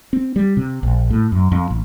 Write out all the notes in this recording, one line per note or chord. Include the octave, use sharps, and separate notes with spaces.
C4
G3
C3
A#1
A2
F#2
F2
A1